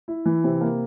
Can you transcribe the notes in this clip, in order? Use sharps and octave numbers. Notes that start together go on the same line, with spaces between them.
E4
E3
C3
A#3